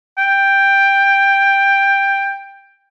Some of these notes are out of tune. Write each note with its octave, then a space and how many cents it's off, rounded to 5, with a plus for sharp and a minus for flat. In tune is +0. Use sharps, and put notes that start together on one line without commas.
G5 +10